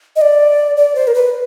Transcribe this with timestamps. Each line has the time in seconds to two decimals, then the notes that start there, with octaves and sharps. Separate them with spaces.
0.16 D#5
0.22 D5
0.77 D5
0.95 C5
1.07 A#4
1.14 B4